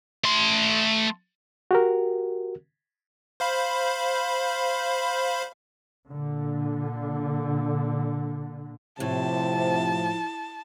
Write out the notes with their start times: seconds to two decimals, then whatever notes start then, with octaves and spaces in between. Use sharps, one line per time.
0.24 A3 C6
1.71 F#4 G4 A#4
3.40 C5 F5 B5
6.10 A#2 D3
9.00 A2 C3 F3 A5